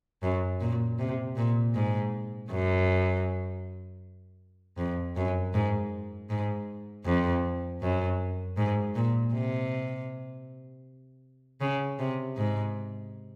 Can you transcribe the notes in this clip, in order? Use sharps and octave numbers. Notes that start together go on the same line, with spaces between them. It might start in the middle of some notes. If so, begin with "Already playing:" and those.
F#2
A#2
C3
A#2
G#2
F#2
F2
F#2
G#2
G#2
F2
F#2
G#2
A#2
C3
C#3
C3
G#2